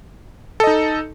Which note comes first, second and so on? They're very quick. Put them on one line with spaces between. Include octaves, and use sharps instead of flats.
A4 D#5 D#4